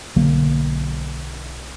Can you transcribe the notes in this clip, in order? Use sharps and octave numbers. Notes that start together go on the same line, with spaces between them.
B1 D3 F#3 A#3